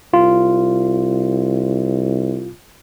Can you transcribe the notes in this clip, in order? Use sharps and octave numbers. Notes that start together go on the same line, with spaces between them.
C2 F4